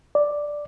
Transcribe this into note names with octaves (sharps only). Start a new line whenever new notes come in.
D5